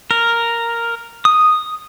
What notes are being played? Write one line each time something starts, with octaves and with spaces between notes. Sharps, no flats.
A#4
D#6